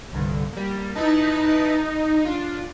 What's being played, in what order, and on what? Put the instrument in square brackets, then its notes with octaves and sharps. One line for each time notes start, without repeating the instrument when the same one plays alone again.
[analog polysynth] C2 G2 D3
G3 A#3
[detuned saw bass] D#4 [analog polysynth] E4 B4 A5
[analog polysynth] D4 F4